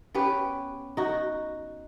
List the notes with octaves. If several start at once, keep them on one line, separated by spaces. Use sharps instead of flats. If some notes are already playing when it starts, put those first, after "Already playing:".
B3 C#4 G4 B4
D#4 F#4